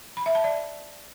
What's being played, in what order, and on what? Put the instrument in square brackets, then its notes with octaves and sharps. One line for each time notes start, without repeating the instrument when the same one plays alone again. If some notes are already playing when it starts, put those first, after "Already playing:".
[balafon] B5
E5
A5
D5